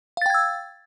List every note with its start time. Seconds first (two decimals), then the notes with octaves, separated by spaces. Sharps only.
0.17 F5
0.22 A6
0.26 G5
0.30 G#6
0.34 E6